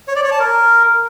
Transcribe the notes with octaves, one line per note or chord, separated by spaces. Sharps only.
C#5
D5
C#5
A5
A#4